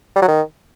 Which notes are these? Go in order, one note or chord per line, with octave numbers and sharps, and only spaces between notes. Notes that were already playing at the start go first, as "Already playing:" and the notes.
G3
F#3
D#3